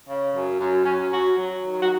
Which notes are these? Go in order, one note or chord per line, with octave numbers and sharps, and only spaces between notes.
C#3
F#2
F#2
F#2 C#4
F#3 F#4
F#3
D#3
F#4